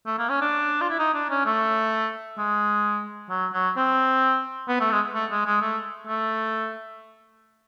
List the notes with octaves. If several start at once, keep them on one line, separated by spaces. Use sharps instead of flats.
A3
A#3
C#4
D4
F4
E4
D#4
D4
C#4
A3
G#3
F#3
F#3
C4
B3
A3
G#3
A3
G#3
G#3
A3
A3